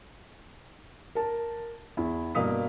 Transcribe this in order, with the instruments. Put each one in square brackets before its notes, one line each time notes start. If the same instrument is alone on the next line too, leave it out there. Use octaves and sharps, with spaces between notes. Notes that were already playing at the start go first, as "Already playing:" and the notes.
[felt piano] A#4 A5
E2 E4
G2 B2 A#3 F5 D#6 B6